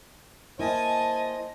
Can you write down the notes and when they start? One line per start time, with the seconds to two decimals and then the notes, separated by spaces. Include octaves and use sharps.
0.59 A#3 E4 C5 D#5 G#5 A5